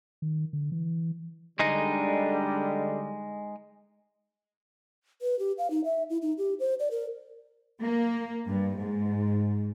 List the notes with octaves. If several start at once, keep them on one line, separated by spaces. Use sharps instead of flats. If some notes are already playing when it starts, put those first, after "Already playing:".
D#3
D3
E3
D3 G3 G#3 D4 D#4
B4
G4
F5
D#4
E5
E4
D#4
G4
C5
D5
A#4
A#3
G2
G#2